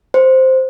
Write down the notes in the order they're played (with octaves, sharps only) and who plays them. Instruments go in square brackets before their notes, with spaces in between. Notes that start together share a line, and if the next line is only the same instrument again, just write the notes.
[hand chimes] C5